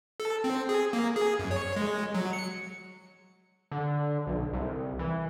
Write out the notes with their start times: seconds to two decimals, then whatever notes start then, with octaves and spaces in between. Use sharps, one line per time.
0.20 A4
0.44 C4
0.69 G#4
0.93 A#3
1.16 G#4
1.39 F#2
1.51 C#5
1.76 G#3
2.15 F#3
2.33 C#7
3.72 D3
4.27 B1
4.53 C2
4.99 E3